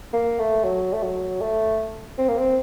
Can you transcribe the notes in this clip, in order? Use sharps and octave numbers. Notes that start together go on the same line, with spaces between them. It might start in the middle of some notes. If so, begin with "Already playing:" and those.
A#3
A3
F#3
A3
F#3
A3
C4
A#3
C4